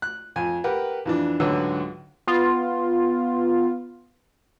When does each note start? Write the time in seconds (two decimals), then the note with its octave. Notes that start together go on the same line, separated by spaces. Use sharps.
0.02 F#6
0.36 F2 G#5
0.64 G4 A#4 B4 F#5
1.05 F2 E3 D4
1.40 C#2 G#2 D3 F#3 B4 E6
2.27 B3 F4